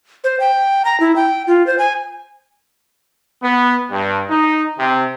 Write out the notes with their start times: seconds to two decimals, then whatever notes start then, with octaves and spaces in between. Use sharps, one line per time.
0.24 C5
0.40 G5
0.85 A#5
1.00 E4
1.16 G5
1.47 F4
1.67 C5
1.78 G#5
3.42 B3
3.91 G2
4.29 D#4
4.79 C3